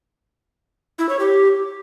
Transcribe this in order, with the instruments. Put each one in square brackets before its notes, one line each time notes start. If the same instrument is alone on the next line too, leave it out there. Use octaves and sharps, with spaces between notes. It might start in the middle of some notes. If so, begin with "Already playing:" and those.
[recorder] E4
C#5
G4